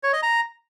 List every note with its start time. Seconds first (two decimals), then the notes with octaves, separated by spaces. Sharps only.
0.03 C#5
0.13 D#5
0.23 A#5